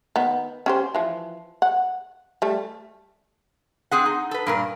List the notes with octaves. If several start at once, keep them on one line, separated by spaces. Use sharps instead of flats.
D#3 B3
C#4 G4 C5
E3 F3
F#5
G3 A3
C4 G#4 F#5
D#4
A4 B4
G2 A#2 A#4